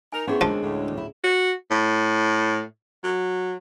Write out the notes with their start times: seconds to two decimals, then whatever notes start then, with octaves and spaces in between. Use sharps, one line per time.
0.13 D#4 A#4 G#5
0.27 B3 C#4 D4 E4 G#4 C5 C#5 E5
0.41 D#3 F3 G#3 C4 D4 C#5
0.62 D2 A2
0.97 E4
1.24 F#4
1.71 A2
3.04 F#3